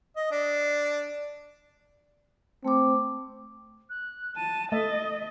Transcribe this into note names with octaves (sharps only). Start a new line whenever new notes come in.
D#5
D4
A3 C4 D6
F#6
A5 D#7
A3 D#5 E5 A6